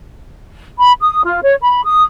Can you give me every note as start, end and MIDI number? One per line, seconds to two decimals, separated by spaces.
0.77 0.92 83
1.01 1.22 87
1.25 1.40 65
1.43 1.55 73
1.62 1.81 83
1.85 2.02 87